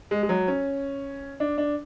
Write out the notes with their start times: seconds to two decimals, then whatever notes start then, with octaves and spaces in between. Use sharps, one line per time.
0.11 G#3
0.23 G#3
0.29 F#3
0.48 C#4
1.40 D4
1.58 D4